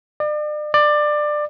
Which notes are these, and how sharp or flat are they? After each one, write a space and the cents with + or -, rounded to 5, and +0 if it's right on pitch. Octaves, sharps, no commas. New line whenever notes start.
D5 +40
D5 +20